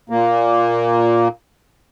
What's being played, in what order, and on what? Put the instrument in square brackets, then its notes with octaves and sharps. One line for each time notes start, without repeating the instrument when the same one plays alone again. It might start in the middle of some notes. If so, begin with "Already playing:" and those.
[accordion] A#2 A#3